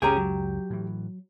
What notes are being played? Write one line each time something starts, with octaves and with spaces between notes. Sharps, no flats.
C#2 F#2 C#4 G4 G#4 G5 A#5
F#3
A2 E3